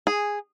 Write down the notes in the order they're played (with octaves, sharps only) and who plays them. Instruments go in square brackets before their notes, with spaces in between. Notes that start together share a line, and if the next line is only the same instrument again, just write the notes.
[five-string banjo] G#4